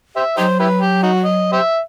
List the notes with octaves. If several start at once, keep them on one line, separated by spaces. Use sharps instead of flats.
G4 C5 E5
F#3 D#4 G4 C5
E4 G4 B4
G4
D#4 F#4
D#5
G4 C5 E5